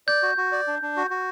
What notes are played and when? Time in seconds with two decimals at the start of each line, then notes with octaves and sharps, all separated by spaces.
0.08 D5 G6
0.23 F#4
0.37 F#4
0.52 D5
0.67 D4
0.82 D4
0.97 F#4
1.10 F#4